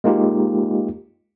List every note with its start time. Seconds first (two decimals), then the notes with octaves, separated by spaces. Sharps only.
0.04 G#3 A#3 D#4 F4 G4